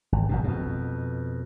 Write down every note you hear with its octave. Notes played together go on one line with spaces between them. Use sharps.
G#1
G#1 F#2 B2
F2 B2